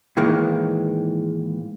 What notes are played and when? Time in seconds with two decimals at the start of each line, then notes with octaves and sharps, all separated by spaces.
0.17 A2 D#3 E3 G#3 A#3